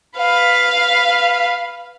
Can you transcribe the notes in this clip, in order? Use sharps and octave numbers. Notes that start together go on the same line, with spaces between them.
B4 F5